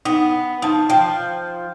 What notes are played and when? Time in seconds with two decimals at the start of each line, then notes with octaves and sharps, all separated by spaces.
0.05 B3 D#4
0.62 F3 D#4 A5
0.90 F3 G5